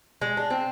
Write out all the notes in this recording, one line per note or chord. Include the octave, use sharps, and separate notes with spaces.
G#3
D4
C4